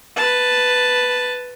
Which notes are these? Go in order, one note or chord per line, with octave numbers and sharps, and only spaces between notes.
B4 A5